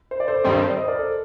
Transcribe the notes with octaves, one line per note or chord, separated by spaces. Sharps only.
C5
D5
A4 C5
G2 D#3 G3 C4 C5 D#5
C5 D#5
A#4 D5
A4 C5